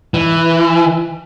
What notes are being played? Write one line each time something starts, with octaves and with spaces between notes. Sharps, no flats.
E3